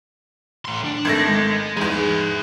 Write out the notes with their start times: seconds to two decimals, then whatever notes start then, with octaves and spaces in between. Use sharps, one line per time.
0.65 A2 C6
0.85 D4
1.05 G#1 A3 A#6
1.28 G#3
1.77 E2 G#2 G#4 E5